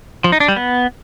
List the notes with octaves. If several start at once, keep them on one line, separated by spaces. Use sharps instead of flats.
F3
D#4
D4
G3
B3